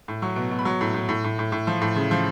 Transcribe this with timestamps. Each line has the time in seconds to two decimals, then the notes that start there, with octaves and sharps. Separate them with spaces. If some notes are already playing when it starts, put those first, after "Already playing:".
0.08 A2
0.22 F#3 C#6
0.36 B2
0.51 B2
0.59 B5
0.65 F#3 C#6
0.81 A2
0.94 A2
1.09 A2
1.24 A2
1.39 A2
1.52 A2
1.67 F3
1.82 A2
1.96 C#3
2.11 F3